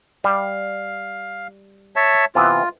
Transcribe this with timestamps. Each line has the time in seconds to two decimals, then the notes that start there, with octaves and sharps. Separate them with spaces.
0.24 G3 F5
1.96 C#5 E5 A5
2.35 C3 E3 B3 F4